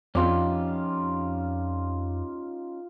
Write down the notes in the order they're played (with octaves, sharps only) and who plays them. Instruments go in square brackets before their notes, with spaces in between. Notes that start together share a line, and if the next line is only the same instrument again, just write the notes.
[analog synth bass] F2 [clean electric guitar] C#4 D#4 G4 [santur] F4 D5